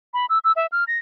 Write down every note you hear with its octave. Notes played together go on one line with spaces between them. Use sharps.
B5
E6
E6
E5
F6
A#6